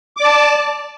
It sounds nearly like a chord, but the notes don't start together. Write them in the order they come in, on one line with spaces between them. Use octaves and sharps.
D6 D5 A5